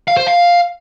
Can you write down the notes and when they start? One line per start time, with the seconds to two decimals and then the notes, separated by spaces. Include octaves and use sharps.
0.08 F5
0.17 C5
0.27 F5